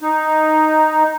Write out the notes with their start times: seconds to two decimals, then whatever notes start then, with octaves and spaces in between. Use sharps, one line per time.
0.01 D#4